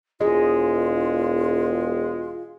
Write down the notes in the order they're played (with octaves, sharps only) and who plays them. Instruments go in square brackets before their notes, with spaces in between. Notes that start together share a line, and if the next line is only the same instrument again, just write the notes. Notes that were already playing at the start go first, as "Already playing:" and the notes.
[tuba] E1 [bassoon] G#3 [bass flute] F4 [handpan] G#4 D#5